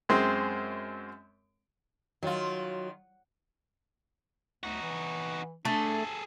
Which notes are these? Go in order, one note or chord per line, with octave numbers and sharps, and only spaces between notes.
F#2 G#3 C4
D#3 F#3 F4
D2 D#4 F#4
E3
A3 D4 G#4 A4